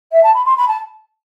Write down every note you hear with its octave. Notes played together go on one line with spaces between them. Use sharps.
E5
A5
B5
C6
B5
A5